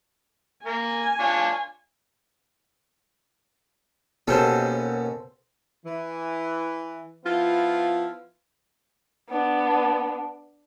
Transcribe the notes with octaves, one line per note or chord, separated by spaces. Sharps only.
A#3 A#4 G#5
D4 F4 C#5
D#2 B2 C#4 A4 C5
E3
F3 B3 E4 F4
B3 D4